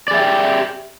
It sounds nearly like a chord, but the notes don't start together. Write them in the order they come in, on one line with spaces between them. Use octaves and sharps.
D5 G#4 E5 G5 G4